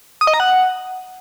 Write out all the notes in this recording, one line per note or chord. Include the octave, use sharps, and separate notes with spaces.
D#6
D#5
A#5
F#5